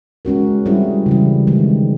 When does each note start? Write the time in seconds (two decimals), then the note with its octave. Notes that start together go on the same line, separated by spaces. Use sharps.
0.25 G#3 C#4 F#4 A#4
0.66 G3 C4 E4 G#4
1.06 C#3 E3 G3
1.47 D#3 G#3 C4